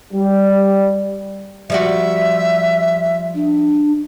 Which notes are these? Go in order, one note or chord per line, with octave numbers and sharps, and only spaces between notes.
G3
F3 G3 F#4 E5
D4